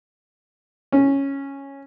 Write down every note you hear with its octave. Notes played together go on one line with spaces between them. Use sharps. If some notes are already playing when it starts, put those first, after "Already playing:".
C#4